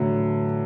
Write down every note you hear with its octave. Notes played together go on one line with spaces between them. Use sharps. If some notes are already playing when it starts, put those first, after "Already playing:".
Already playing: A2 D3 E3 F#3